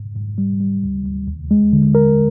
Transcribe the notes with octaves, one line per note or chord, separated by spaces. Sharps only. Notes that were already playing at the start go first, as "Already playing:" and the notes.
Already playing: G#2
G#2
G3
G3
D2
D2
D#2
G#3
D3
A#4